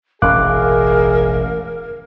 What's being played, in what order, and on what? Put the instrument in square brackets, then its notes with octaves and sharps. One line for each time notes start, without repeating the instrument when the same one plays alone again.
[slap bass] E1 A1 C#4 [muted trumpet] G#4 [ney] A#4 [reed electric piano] F5 D6 F#6